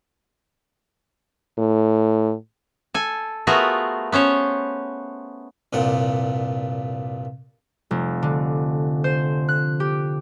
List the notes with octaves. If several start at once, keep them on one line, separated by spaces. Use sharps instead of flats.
A2
A4 G#5
A3 B3 F4 F#4 G#4 A#4
B3 C#4 C5 C#5
C2 G2 A#2 F#5
F1
D3
C5
F#6
G4